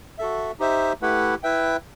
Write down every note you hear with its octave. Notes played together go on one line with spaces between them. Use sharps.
F#4 A4 E5
D#4 G4 C5 E5
A3 E4 G4 B4 F#5
E4 B4 E5 G5